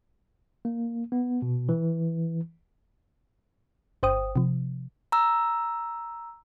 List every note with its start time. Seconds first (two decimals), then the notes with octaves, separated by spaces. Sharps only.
0.65 A#3
1.12 B3
1.42 B2
1.69 E3
4.03 G1 C5 G5 D#6
4.36 C3 F3
5.12 A#5 E6